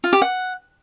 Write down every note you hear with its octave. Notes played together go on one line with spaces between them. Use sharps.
F4
G4
F#5